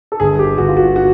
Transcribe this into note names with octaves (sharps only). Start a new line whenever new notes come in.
A4
G1 G#4
G4
G1 F#4
F4
F#4
F#4